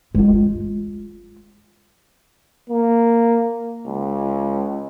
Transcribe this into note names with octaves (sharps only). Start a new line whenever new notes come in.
G#3 F4
A#3
C#2